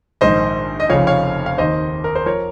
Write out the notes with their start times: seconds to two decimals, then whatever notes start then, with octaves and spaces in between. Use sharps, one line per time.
0.21 A#1 G#2 D#3 C5 D#5
0.80 D#5
0.89 F1 F2 C#3 F3 C#5 F5
1.07 C#5 F5
1.46 F5
1.58 D#2 D#3 C5 D#5
2.04 A#4
2.15 C5
2.26 F3 A#4 C#5